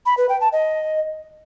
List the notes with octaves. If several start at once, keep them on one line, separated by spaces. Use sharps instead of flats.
B5
B4
G5
A5
D#5